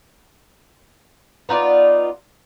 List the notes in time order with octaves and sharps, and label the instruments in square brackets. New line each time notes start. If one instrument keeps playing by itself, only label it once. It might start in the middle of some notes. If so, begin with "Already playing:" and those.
[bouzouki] B3 D#4 F4 D5